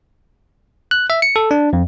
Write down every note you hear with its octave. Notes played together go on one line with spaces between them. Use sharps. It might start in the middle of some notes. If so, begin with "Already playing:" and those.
F#6
E5
C#7
A4
D4
F2